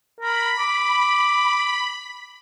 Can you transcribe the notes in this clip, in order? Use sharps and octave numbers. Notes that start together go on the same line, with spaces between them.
A#4 B5
D6